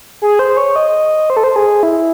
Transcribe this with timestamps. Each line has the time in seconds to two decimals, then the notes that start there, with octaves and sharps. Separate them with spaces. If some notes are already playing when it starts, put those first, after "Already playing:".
0.22 G#4
0.39 C5
0.57 C#5
0.76 D#5
1.30 C5
1.37 A4
1.44 C5
1.56 G#4
1.83 E4